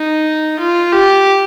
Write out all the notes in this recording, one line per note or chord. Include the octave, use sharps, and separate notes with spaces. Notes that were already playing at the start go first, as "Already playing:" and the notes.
Already playing: D#4
F4
G4